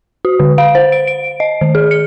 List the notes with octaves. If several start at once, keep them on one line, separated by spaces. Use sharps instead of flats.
F#4
D3
F5
C5
D7
D7
D#5
D#3
G#4
C#7